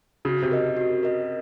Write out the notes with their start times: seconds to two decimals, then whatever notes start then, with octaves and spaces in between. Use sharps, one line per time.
0.25 C#3 F#4
0.42 C3
0.51 A#4 D#5
0.77 F#4
1.03 A#4 D#5